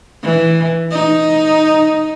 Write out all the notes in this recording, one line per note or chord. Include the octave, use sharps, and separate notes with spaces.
E3
D#4